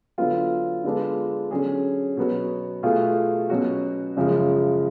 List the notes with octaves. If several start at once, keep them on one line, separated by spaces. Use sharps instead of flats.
D3 F#3 B3 F4
D3 G#3 B3 D4 F4
D3 F#3 C#4 G#4
B2 F#3 B3 F#4
B2 A3 F4 G#4
B2 F#3 C#4 F#4
F#2 C#3 F3 G#3